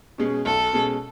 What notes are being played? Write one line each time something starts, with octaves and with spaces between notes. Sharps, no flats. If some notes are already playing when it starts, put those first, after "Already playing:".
B2 G#3 C#4 G#4
B1 A4
B2 G#3 C#4 G#4